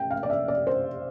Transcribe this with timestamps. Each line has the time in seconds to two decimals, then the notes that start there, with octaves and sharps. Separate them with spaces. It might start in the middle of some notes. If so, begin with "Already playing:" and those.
Already playing: G5
0.11 F5
0.23 D5
0.30 E5
0.48 D5
0.67 C5